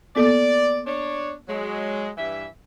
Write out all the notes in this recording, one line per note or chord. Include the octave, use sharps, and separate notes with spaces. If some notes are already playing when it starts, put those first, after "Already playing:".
A#3 B3 A4 D5
D4 C#5
F#3 G#3
G2 E3 E5